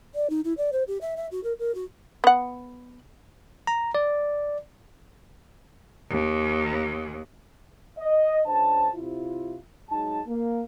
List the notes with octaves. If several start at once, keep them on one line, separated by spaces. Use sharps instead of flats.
D5
D#4
E4
D5
C5
G4
E5
E5
F#4
A#4
A#4
F#4
B3 F#5
A#5
D5
D#2
D#5
C#2 D4 C5 A5
C3 E4 F4
F#3 G#3 D#4 A5
A#3